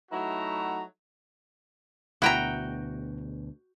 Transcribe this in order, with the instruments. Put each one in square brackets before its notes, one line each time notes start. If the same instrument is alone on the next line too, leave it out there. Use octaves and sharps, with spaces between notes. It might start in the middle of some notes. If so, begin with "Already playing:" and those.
[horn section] F#3 A3 D#4 E4 F#4 A#5
[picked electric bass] D2 B2 [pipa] E4 A#5 [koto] F#4 G5